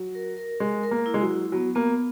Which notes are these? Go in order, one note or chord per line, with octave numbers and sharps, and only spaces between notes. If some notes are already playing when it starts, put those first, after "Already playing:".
Already playing: F#3
A#4
A#4
G#3 A#4
A#4
A#3
E4
G#3
F#3
E4
F#3 B3
A#3 B3